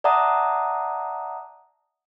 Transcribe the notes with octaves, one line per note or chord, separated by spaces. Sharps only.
D5 E5 F#5 A5 A#5 D#6